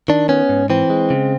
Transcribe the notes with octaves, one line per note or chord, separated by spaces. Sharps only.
D#3 D4
B3 C#4
G#2
E3 C4
G#3
C#3